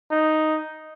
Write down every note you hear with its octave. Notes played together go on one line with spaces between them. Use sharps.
D#4